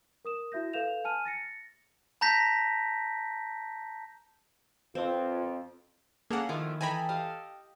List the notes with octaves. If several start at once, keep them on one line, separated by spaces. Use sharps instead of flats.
A#4 D#6 E7
E4 F#4 E5 G6 A#6
A4 B4 F5 G6 E7 F7
G#5 A5 F6 D#7
A6 A#6 C#7
A5 A#5 G6 A#6 B6
F2 C4 F4 B4 F5
A#3 C#4 G#4 A4 F#5
D#3 F3 A3 E4 G#5 D6
E3 A4 D#5 G5 G#5 A#5 B5
G4 D#5 F5